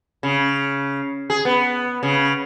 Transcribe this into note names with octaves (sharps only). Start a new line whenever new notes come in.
C#3
G#4
B3
C#3